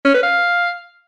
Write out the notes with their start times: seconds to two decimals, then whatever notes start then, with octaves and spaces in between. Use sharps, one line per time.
0.05 C#4
0.14 B4
0.23 F5